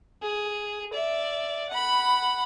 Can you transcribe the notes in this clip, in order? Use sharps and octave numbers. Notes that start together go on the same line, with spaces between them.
G#4
D5 E5
F#5 B5